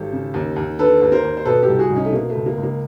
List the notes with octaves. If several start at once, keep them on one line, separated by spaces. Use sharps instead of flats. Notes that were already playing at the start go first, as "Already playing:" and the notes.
Already playing: G#1 G4 A4
C#3
D#2
D#2
D3 A4 B4
D#2
A#4 C5
D#2
C5
B2 A4 B4
G4 A4
C2
F#4 G#4
C2
C#4 D#4
A3
B2 A#3
A3
C#2
A#3
C#2
A#3